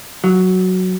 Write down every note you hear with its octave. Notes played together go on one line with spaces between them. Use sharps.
F#3